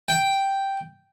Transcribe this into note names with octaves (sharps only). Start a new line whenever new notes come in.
G5